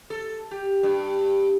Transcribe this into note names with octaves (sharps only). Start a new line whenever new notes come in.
A4
G4
G2